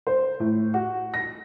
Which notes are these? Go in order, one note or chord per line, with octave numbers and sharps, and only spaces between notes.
C5
A2
F#4
A#6